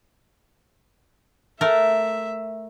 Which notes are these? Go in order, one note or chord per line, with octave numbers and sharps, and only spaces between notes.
A3 A#4 E5